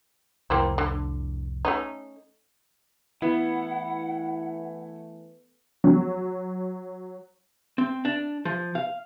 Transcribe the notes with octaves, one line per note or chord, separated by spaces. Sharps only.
C2 F2 A2 A#3 C4 E4
D3
A3 C#4 D#4
E3 A3 B3 E4 F#5
F#3
C4
D4
F3
F5